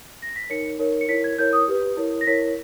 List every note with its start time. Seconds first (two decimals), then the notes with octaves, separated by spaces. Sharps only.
0.22 A#6
0.36 B6
0.49 D#4 A#4 C#5 C#7
0.79 D#4 A#4 C#5
1.01 C#7
1.08 E4 A#4 C#5 B6
1.24 G#6
1.38 E4 A#4 C#5 G6
1.53 D#6
1.68 G4 B4
1.97 E4 A#4 C#5
2.21 A#6
2.27 E4 A#4 C#5 B6